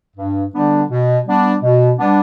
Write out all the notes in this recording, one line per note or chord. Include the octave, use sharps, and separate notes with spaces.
G2
D3 G3 B3 D4
B2
G3 B3 D4
B2
G3 B3 D4